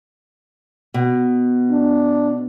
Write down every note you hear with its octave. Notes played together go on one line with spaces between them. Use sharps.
B2
D4